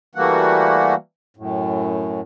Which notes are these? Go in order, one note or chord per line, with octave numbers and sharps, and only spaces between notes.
E3 G3 A3 A#3 F#4 F#5
F#2 A2